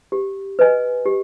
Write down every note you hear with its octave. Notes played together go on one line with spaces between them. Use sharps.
G4
B4 D#5 G#5
G4